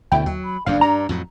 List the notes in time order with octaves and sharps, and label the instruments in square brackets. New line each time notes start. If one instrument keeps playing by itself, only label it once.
[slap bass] D2 B2 [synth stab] D3 E4 G5
[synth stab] D#2 [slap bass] F#3
[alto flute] B5
[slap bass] F#1 E2 G2 [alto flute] D4 [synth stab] F5
[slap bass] G2 [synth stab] A#5
[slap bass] F2 A2 F#3